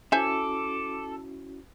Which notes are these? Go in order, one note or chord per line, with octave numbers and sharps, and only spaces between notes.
C#4 E4 F#4 A4 C5 E5 G#5 D6